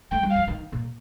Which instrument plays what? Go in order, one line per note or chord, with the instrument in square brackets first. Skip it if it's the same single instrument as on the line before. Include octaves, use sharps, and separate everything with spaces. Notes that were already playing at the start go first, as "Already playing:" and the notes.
[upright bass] A3 [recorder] G5
[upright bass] G3
[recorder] F5
[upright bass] F3
D#3
A#2